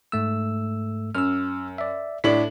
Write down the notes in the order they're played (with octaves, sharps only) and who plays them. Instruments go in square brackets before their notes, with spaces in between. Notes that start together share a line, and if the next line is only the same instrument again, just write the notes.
[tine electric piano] G#2 A3 E6
[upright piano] F#2 [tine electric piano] E6 F6
[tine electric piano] D5 E5
[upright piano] A2 D4 F#7 [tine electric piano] B6